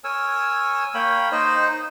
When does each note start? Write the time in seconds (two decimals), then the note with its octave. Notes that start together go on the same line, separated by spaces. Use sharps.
0.04 A#4 C#5 G#5 E6
0.95 A#3 C#5 G5 B5
1.32 D#4 C5 D#5